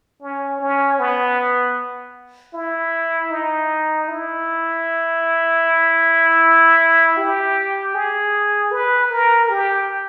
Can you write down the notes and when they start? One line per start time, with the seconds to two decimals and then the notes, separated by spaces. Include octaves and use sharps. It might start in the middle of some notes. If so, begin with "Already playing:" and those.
0.22 C#4
0.61 C#4
0.99 B3
2.54 E4
3.31 D#4
4.08 E4
7.17 G4
7.94 G#4
8.72 B4
9.10 A#4
9.49 G4